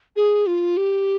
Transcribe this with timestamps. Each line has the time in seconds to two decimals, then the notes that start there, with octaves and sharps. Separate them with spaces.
0.16 G#4
0.47 F4
0.77 G4